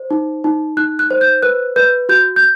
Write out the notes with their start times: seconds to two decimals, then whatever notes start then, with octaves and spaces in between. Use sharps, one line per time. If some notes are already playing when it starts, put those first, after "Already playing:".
Already playing: C5
0.11 D#4
0.44 D#4
0.77 D#4 F#6
0.99 F#6
1.11 C5
1.21 G6
1.43 B4 F#6
1.76 B4 G6
2.09 F#4 G6
2.36 G6